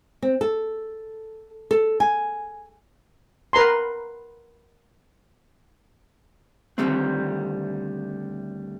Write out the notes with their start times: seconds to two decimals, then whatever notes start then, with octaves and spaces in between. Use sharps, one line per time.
0.22 C4
0.41 A4
1.71 A4
2.00 G#5
3.53 A#4 B4 A#5 C6
6.78 D2 D#3 F3 G3 A3 C4